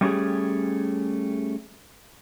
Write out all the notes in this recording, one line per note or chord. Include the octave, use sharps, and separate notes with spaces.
G3 A3 C#4 F4 G4 G#4